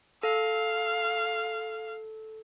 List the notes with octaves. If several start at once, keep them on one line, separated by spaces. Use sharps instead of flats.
A4 F5